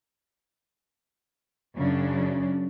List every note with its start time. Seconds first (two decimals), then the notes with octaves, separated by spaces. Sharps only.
1.76 F#2 C#3 D4